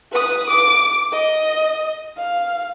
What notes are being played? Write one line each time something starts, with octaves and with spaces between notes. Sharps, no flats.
B4 D#6
D6
D#5
F5